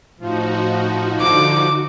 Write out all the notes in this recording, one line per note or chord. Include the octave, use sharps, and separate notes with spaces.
A2 F3 D#4 F#4
D3 D6